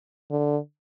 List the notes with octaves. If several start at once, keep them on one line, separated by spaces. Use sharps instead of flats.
D3